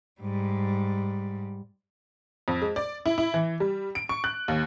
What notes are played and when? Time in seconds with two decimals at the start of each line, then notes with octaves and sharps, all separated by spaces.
0.21 G#2 G3
2.48 F2
2.62 G#3
2.76 D5
3.06 E4
3.18 E4
3.34 E3
3.60 G3
3.95 D7
4.09 C#6
4.24 F#6
4.48 D#2